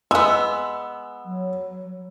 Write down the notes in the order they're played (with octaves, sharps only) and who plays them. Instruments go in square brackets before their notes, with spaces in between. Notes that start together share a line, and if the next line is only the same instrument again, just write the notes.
[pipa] G#3 B3 [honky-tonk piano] E6
[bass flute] F#3